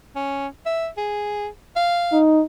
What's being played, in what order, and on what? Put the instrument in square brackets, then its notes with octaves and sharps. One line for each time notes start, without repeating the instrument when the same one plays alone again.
[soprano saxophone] C#4
E5
G#4
F5
[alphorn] D#4